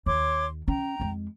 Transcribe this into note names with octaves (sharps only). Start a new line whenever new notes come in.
D#2 C#5 C6 D6
C#4 G5 A#5
F2 G#3